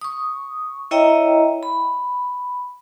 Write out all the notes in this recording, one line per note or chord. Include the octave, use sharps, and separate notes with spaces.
C#6 D#6
E4 C#5 D#5 E5 G5 A#5
B5